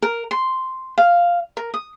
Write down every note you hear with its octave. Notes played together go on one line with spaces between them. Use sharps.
A#4
C6
F5
A#4
D#6